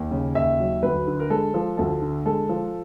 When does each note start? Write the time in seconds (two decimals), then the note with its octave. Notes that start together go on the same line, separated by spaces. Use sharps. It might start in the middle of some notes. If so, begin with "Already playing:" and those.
Already playing: D#2
0.11 C#3
0.35 D#2 E5
0.59 F#3
0.83 D2 B4
1.07 D3
1.20 A#4
1.30 G#3 A4
1.54 F3
1.77 D2 A4
2.02 D3
2.26 G#3 A4
2.49 F3